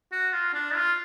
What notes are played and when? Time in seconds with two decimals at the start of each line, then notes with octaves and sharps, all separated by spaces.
0.12 F#4
0.33 F4
0.54 D4
0.74 F4